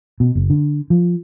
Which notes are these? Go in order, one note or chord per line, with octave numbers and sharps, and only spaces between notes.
B2
F#1
D3
F3